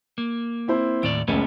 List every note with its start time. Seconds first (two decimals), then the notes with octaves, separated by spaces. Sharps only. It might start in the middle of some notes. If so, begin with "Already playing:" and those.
0.18 A#3
0.68 C4 E4 C5
1.03 D#2 A2 D5 D7
1.28 F#1 C#2 A3 B3 C#4